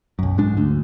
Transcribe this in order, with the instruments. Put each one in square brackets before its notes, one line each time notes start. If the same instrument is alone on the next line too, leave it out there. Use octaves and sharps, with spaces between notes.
[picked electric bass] B1 F#2
G#2 G#3 D4
D2